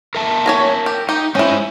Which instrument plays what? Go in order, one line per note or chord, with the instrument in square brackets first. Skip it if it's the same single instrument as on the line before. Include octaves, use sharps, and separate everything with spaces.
[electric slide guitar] A#4 E5 A5
[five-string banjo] C#5 G#5 A#5
G4
[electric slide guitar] D#4 [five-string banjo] G4
[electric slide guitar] G#3 C5 G#5 [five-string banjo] C#4 E4